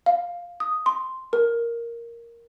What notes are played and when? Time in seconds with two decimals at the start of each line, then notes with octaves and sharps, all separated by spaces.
0.06 F5
0.60 D#6
0.86 C6
1.33 A#4